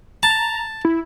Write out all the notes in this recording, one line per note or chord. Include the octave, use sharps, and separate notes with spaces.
A5 A#5
E4